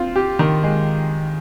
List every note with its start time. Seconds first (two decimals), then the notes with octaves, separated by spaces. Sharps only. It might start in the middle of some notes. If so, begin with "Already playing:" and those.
Already playing: C4 F4
0.16 G4
0.39 D#3
0.63 G#3